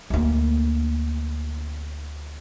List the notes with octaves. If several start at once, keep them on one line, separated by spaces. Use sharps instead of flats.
D2 A#3